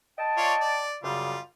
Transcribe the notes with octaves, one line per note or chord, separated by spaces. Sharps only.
D#5 G5 A5
F4 C#5 D5
D5
F#2 C#3 G3 F4